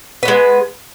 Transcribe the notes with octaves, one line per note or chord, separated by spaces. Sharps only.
G#3 B3 B4